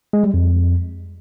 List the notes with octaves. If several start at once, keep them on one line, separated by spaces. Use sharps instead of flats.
G#3
G3
F2